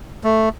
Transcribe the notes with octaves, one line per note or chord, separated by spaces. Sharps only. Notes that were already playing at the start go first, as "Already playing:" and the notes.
A3